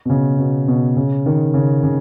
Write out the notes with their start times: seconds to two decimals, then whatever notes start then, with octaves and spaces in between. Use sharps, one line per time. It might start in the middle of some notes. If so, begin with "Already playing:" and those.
0.05 B2
0.10 C#3
0.38 B2
0.68 B2
0.96 C#3
1.26 D#3
1.54 C#3
1.83 C#3